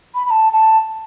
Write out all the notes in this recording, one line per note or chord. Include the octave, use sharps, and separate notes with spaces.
B5
B5
A5
A5